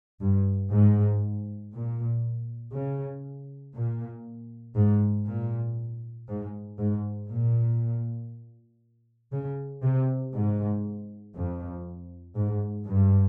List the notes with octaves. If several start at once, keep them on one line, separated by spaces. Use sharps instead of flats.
G2
G#2
A#2
C#3
A#2
G#2
A#2
G#2
G#2
A#2
C#3
C3
G#2
F2
G#2
G2